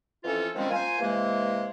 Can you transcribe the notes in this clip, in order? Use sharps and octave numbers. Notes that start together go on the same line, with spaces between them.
F2 E3 C#4 F4 A4
D#3 F3 G3 G#3 C4 C#4
A#3 F4 C5 G#5
C3 E3 G#3 A#3